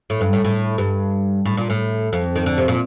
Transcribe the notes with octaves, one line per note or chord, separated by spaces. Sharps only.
A2
G2
A2
A2
G2
A2
A#2
A2
F2
D#3
D3
C3
A#2